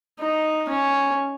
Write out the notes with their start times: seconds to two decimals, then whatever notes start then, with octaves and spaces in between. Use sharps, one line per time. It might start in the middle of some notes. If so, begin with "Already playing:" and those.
0.20 D#4
0.69 C#4